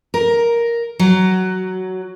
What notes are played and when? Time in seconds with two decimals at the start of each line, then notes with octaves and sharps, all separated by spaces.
0.14 A#4
0.99 F#3